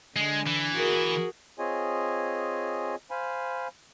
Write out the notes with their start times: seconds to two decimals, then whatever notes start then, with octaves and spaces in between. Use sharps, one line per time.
0.16 D3 G#3
0.46 E3
0.76 F#4 G#4 A#4
1.59 C4 F4 G#4 C#5 D#5 G#5
3.11 C5 F5 G#5 B5